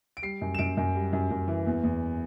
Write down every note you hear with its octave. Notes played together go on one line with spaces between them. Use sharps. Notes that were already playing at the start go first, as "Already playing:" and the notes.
D7
G3 C7
F#2
E7
F#2 D7
F#2
G3
F#2
F#2
E3
E2
E2